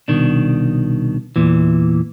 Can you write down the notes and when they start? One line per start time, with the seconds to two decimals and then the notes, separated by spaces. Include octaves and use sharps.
0.08 C2 B2 D#3 D4
1.36 E2 A#2 E3